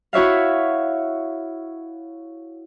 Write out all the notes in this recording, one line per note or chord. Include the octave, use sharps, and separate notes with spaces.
E4 F#4 C#5 E5 F5